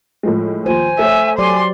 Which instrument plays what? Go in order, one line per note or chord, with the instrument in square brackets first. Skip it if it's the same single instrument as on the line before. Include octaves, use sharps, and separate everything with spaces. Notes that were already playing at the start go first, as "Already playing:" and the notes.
[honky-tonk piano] A2 F3 G#3
[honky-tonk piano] D#2 F3 [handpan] C5 [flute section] G#5
[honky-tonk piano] A3 C#5 [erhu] E5
[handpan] F#3 G4 D5 [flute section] G#5 D6 [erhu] C6